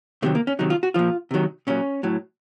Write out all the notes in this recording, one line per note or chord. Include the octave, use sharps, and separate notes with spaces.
C3 D#3 F#3 A3
A#3
C#4
C3 D#3 F#3 D#4
F4
F#4
A#2 F3 F4
C3 D#3 F#3
A#2 F#3 C#4
A2 F#3